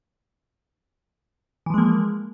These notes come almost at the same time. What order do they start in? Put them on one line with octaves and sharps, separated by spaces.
E3 F3 G#3 A#3